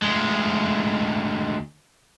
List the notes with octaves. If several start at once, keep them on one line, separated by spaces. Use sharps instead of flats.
D2 G#3